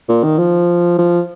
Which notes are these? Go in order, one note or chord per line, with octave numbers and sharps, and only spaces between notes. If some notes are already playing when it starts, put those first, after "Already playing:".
A#2
D#3
F3
F3